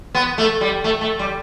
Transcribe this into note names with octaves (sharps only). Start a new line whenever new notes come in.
B3
A3
G3
A3
A3
G3